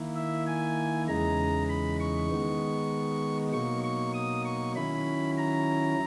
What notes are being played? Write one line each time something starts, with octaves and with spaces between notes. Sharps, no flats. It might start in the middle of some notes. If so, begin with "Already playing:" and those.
Already playing: D#3 A#3 E4
E5
G#5
E2 C#3 E3 G#3 D#4 A#5
B5
C#6
D#3 G#3 B3 D#4
B2 F#3 A#3 D#4 C#6
C#6
D#6
C#6
D#3 F#3 C#4 E4 B5
A#5